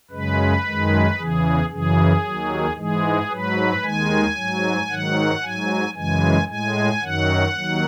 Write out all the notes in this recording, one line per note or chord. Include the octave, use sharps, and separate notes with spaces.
F#2 C#3 G#3 B4
F#2 D#3 G#3
E2 C#3 E3 G#4
F#2 C#3 E3 G#4
D#2 D#3 F#3
G#2 E3 G#3 G#4
G#2 F#3 B4
D#2 D#3 G#3 G#5
G#2 F#3
G#2 D#3 F#3 F#5
G#2 F#3 G#5
F#2 C#3 E3 G#3 G#5
A2 G#3 G#5
F#2 D#3 F#3 F#5
D#2 D#3 F#3